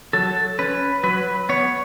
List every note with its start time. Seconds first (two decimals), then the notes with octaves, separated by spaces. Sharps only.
0.13 F#3 A4
0.59 C#4 B4
1.03 F#3 B4
1.49 B3 C#5